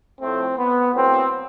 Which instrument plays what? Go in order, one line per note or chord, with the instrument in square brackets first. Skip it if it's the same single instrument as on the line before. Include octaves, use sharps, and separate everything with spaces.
[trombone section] A2 F3 A3 C4
B3
A2 F#3 A#3 C4